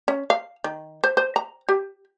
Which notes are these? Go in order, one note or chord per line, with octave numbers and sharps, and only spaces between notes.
C#4
F5
D#3
C5
C5
A#5
G4